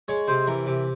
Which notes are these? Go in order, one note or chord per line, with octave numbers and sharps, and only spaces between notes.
G#3 C#5
C3 C5
E3 A#4
C3